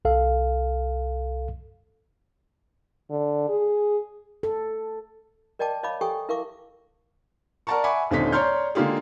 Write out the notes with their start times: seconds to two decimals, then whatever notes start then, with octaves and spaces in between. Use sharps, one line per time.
0.05 C2 A4 F5
3.10 D3
3.49 G#4
4.43 A4
5.59 A#4 D5 D#5 G5 A5 D6
5.83 C#5 D#5 F5 B5 D6
6.01 G4 A4 G5 G#5 C#6 D#6
6.29 E4 A#4 E5 F5 C#6 D6
7.67 A#4 D5 F#5 A5 A#5 C#6
7.84 E5 F#5 G#5 B5 C#6 D6
8.11 D#1 D3 C4 C#4 D#4 B6
8.32 C#5 D5 A#5 C6 F6 G6
8.75 D3 G#3 A#3 F4 G4 G#4